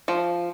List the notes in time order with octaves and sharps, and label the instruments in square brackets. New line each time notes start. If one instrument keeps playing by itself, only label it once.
[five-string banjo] F3